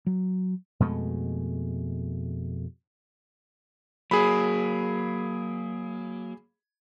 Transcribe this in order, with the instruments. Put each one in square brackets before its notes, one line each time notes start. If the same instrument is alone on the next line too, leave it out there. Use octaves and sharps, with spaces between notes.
[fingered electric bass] F#3
[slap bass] F2 B2 G#3 A3
[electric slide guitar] F#3 A#3 [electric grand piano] G#4 B5